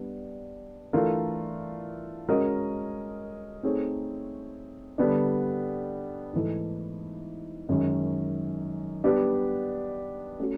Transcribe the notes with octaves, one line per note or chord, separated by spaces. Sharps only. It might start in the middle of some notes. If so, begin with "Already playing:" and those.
Already playing: G3 B3 D4
E3 A3 D4 F4 A#4
G#3 C#4 F#4 A#4 D#5
A3 C4 D#4 G#4 C#5
D3 G3 B3 D4
G#2 E3 A3
F#2 D#3 G#3 C#4
G3 B3 D4 G4
A3 C#4 F#4